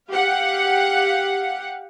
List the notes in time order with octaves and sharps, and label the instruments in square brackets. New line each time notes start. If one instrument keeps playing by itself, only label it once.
[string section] G4 F5 F#5